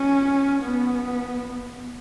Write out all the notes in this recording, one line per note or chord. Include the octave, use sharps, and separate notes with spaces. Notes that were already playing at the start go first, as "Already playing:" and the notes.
Already playing: C#4
B3